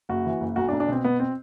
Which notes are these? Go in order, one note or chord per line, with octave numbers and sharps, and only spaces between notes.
F#1 F#4
E3
F#1
B1 F#4
D4
B1
D4
B2 C4
B2 B3
C4